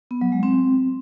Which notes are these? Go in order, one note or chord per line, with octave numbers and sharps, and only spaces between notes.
B3
F#3
G#3
C4